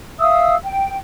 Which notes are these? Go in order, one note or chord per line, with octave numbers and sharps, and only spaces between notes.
E5 F5 D#6 E6
G5